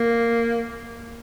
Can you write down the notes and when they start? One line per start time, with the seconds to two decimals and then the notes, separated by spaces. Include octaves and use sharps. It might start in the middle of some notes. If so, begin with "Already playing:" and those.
Already playing: A#3